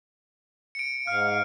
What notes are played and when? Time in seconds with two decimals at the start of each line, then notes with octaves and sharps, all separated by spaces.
0.75 C#7 D7
1.07 G#2 F5 F6